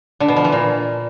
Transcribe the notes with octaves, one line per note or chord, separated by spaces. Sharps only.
D3
B2
F3
E3
A#2